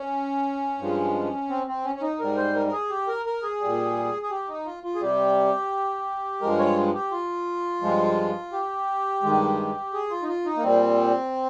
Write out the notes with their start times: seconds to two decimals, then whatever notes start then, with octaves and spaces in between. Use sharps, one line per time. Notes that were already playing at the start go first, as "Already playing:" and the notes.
Already playing: C#4
0.79 G2 F3 G#3
1.49 C4
1.67 C4
1.85 C#4
1.95 C#4
2.02 D#4
2.20 G#2 G3 A#4
2.37 C5
2.55 A#4
2.67 A#4
2.72 G#4
2.90 G4
3.07 A#4
3.26 A#4
3.43 G#4
3.61 A#2 G3
4.22 G#4
4.31 G4
4.48 D#4
4.66 F4
4.83 F4
4.95 G#4
5.01 C3 G3 G4
6.41 G2 F3 G#3 A#4
6.59 C#5
6.94 G4
7.12 F4
7.82 G2 F3 G#3
8.52 G4
9.23 G2 D#3 G#3
9.93 G#4
10.10 F4
10.23 D#4
10.28 F4
10.45 D#4
10.57 A#3
10.63 A#2 G3 C4